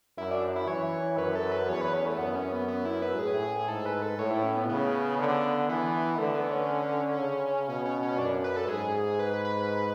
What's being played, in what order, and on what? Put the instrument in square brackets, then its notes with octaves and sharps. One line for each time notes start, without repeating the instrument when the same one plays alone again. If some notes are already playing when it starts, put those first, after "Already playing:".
[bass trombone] F#2 [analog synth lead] E4
[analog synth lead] D4
E4
[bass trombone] E3 [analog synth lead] C#5
[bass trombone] F#2 [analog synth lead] B4
[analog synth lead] A4
B4
[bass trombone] E2 [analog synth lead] C#5
[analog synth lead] B4
C#4
A3
[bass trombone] F#2 [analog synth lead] B3
[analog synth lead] C#4
B3
B3
E4
B4
[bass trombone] A2 [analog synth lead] G#4
[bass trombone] G#2 [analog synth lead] A4
[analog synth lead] B4
A4
[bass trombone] A2 [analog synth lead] C#5
[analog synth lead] E4
C#4
B3
[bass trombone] C#3 [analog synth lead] B3
[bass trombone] D3
[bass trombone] E3 [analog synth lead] B3
[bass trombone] D3 [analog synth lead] A3
[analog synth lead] B3
C#4
[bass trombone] C#3
[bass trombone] B2 [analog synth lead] C#4
[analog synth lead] C#4
C#4
[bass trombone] F#2 [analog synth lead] D4
[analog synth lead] B4
A4
[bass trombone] G#2 [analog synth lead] G#4
[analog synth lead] B4
B4